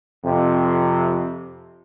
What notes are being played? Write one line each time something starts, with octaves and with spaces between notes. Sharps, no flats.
F2 C3